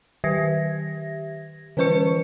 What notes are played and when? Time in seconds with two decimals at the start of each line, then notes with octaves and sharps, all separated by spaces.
0.24 D#3 G4 E5 G#6 A#6
1.77 D3 E3 C#4 B4 C#6 C#7